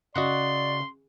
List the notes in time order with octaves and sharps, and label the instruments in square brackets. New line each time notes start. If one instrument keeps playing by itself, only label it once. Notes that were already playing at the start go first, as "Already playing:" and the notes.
[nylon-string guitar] C#3 [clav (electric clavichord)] F#4 D#5 F#5 [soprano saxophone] D5 [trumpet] C6